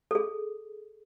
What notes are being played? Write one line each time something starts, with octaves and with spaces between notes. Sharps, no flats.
G#4 A4